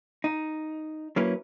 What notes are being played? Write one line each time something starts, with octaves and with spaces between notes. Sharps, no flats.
D#4
F#3 A#3 C#4 E4 B4